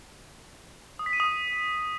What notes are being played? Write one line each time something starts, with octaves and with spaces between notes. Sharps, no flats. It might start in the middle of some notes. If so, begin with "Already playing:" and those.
D#6
B6
D#7
D#6